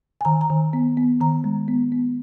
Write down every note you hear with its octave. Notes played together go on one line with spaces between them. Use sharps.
G#5
D#3 A#5
A#5
D#3
B3
B3
D#3 A#5
G#3
B3
B3